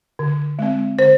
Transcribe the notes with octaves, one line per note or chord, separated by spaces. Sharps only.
D3
G#3 C4
D3 C5